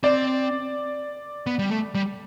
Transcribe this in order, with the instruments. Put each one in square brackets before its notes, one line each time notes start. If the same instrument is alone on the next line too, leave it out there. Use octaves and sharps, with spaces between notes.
[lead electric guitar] C4 [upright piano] D5
[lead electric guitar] B3
G3
A3
G3